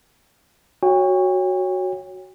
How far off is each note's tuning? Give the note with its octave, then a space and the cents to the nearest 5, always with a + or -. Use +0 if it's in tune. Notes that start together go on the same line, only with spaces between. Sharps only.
F#4 +0 C#5 +0 G5 +45